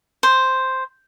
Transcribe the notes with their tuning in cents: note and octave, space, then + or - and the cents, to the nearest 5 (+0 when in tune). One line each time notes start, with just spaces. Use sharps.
C5 +0